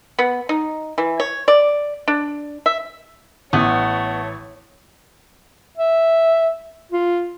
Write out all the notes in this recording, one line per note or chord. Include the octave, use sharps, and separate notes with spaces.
B3
D#4
E3
C#5
D5
D4
E5
A1 A3 B3 C#5
E5
F4